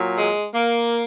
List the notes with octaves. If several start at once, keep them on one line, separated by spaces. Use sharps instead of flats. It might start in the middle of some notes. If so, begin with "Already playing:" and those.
Already playing: A#2 F#3
G#3
A#3